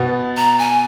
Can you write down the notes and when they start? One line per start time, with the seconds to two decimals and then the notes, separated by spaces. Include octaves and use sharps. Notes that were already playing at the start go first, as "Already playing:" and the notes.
Already playing: B2 B3
0.37 A#5
0.59 G#5